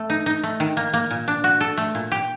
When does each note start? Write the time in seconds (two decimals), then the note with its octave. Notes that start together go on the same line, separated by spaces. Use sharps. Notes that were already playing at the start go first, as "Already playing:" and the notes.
Already playing: A3
0.10 D#4
0.26 D#4
0.43 A3
0.60 D#3
0.77 A#3
0.93 A#3
1.11 A#2
1.28 D4
1.44 F#4
1.61 A4
1.78 A3
1.95 A#2
2.12 G4